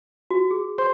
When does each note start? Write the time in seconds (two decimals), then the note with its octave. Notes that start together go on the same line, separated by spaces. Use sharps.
0.31 F#4
0.51 G#4
0.78 C5